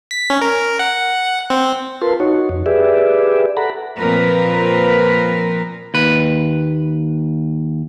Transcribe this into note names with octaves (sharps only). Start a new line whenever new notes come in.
B6
C#4
A#4
F#5
C4
F4 A#4 B4 A5 C6
D#4 F#4 C#5
F2
G4 G#4 B4 D5 E5
A4 F#5 A#5 B5
A#2 F3 C4 A#4 B4
D#2 B4